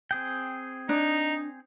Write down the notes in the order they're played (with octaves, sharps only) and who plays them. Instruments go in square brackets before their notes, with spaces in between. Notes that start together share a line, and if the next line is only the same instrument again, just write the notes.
[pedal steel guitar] C4 G#4 G5
[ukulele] D4 [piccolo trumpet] D#4